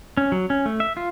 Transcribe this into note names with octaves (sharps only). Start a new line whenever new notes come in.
C#4
F#3
C#4
A3
E5
F4